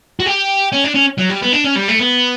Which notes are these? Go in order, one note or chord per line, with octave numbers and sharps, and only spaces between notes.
F#4
G4
C#4
D4
C#4
F#3
G3
B3
D4
C#4
G3
A3
B3